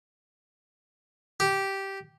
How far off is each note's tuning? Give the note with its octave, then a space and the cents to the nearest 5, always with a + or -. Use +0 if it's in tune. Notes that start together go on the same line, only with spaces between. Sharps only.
G4 -10